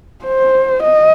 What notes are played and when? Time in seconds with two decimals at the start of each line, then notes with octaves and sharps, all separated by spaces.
0.25 C5
0.83 D#5